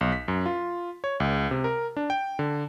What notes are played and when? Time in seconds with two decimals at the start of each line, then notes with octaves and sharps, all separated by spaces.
0.01 B1
0.12 B6
0.28 F#2
0.46 F4
1.04 C#5
1.20 C#2
1.51 C3
1.64 A#4
1.97 D4
2.10 G5
2.39 D3